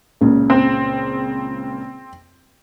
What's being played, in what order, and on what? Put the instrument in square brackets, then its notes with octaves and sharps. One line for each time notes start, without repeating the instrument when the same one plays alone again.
[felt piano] C#2 A#2 C#3
[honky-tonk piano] C4